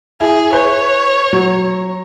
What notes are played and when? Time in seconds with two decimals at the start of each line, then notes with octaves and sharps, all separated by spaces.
0.21 E4 G#4
0.53 B4 C#5
1.33 F#3